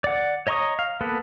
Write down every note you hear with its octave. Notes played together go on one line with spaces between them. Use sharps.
D5 F#5
C#5 D#5 A#5 C#6 D#6
F5
A#3 B3 A4 B4